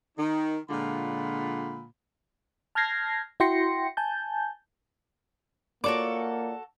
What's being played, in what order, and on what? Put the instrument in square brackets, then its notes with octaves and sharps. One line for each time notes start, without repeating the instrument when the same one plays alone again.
[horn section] D#3 D#4
A#2 D3 G#3 F4 F#5 B5
[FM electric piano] A5 F6 G6 G#6 A#6 C7
E4 F#4 G5 C6 A#6 C#7
G#5 A5 G6
[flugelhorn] A#3 [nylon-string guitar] F4 C#5 D5 [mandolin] F#4 A4 D6